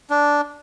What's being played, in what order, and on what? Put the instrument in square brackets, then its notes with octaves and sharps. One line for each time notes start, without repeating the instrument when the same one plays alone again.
[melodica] D4